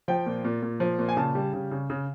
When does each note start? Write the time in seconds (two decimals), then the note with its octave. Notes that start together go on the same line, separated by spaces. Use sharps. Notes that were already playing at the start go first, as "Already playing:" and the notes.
0.08 F3 G5
0.26 A#2
0.44 A#2
0.62 A#2
0.80 F3
0.99 A#2
1.09 G#5
1.17 C#3 A5
1.35 G3
1.53 C#3
1.71 C#3
1.90 C#3